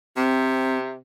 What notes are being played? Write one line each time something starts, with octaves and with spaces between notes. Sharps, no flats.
C3 C4